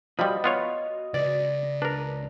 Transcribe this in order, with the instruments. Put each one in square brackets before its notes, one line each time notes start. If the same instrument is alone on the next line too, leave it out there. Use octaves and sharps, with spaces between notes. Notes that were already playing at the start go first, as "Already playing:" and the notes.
[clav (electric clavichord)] F3 G3 [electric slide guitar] F#4 D#5 [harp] B5
[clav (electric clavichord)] B3 F4 C#5
[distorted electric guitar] C#2 C#3 [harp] D5
[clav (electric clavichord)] D4 A#4 [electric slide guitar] B4